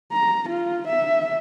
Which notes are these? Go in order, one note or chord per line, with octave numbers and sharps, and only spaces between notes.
A#5
F4
E5